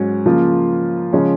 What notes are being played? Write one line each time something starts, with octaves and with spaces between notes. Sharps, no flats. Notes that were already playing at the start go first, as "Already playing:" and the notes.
Already playing: G#2 F#3 C#4
C#3 F3 A#3 F4
C#3 F3 G#3 C#4